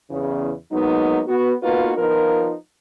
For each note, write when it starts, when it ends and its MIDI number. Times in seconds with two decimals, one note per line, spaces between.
0.11 0.51 40
0.11 0.51 49
0.72 1.20 54
0.72 1.20 56
0.72 1.20 58
0.72 1.20 59
0.72 1.20 63
1.27 1.53 59
1.27 1.53 66
1.62 1.92 58
1.62 1.92 59
1.62 1.92 63
1.62 1.92 65
1.62 1.92 66
1.62 1.92 71
1.98 2.53 53
1.98 2.53 59
1.98 2.53 63
1.98 2.53 65
1.98 2.53 70